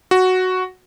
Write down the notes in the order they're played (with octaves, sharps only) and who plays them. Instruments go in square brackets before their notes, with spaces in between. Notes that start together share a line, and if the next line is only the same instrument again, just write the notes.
[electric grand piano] F#4